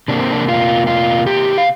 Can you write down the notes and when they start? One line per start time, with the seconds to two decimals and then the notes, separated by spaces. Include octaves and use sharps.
0.08 C3 A#3 D4
0.20 C4
0.31 D4
0.48 F4
0.87 F4
1.26 G4
1.58 F5